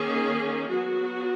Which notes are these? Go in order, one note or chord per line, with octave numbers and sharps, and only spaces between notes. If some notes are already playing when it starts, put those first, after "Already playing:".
Already playing: D#3 A#3 C#4 G#4
F#3 B3 F#4